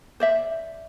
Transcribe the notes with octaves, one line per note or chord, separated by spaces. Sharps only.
C5 D5 E5